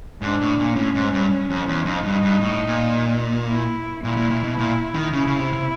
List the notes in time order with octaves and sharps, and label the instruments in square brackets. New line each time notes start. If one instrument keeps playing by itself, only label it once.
[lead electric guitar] G#2 [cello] D4
[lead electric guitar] A2
A#2
[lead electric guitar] A2 [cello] C#4
[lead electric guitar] G#2
G2
F2
E2
[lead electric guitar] F2 [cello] D#4
[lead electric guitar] G2
G2
A2
A#2
[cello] E4
[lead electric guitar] A#2 [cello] E4
[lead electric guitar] A#2
A#2
B2
[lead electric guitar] A#2 [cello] E4
[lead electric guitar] D#3
[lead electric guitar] C#3 [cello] E4
[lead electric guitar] C#3
C3
C3